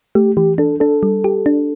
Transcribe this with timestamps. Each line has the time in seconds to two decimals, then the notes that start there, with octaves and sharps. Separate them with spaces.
0.15 A3 G4
0.37 E3 G4
0.58 D4 A4
0.80 D4 A4
1.03 G3
1.24 G4
1.46 D4